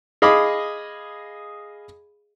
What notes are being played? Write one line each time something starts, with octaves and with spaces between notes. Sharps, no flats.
G#4 D#5 F5 B5 D6